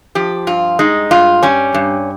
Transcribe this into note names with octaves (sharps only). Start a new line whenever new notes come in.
F3 G4
G2 F4
G#3 D#4
G2 F4
G3 C#4
G2